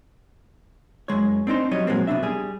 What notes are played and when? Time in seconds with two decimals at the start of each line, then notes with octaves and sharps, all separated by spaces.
1.08 F#2 B2 G#3 C#5
1.47 C4 D4 D#4 C5
1.71 F#3 G3 C#5 D#5
1.87 A#2 F#3 G#3 A#3 C4
2.07 C2 B2 F3 D4 E5
2.22 G3 G#4